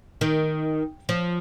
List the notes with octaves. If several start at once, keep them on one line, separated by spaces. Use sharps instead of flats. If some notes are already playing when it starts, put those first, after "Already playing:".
D#3
F3